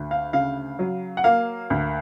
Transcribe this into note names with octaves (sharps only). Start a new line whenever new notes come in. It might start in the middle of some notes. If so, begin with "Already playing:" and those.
Already playing: D2
F5
C#3 F5
F#3
F#5
A#3 F5
D2